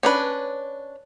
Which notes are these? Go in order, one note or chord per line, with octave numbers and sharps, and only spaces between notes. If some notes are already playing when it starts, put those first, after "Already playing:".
C#4 D4 B4